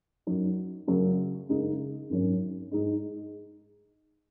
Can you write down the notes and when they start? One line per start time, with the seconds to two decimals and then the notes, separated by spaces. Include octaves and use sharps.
0.27 F#2 F#3 D#4
0.87 F#2 C#3 F#3
1.49 F#2 C#3 G#3 D#4
2.10 G#1 F#2 F#3 C#4
2.71 G#2 G#3 D#4